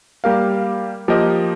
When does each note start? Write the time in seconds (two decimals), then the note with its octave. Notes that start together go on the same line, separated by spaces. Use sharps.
0.24 G3 A#3 G4 A#4 F5
1.08 F3 A#3 G4 A#4 D#5